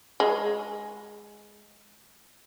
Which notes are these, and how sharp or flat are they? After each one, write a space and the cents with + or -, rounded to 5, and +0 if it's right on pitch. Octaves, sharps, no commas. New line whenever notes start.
G#3 +5